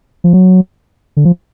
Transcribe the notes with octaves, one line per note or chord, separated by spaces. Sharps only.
F3
F#3
D3
F3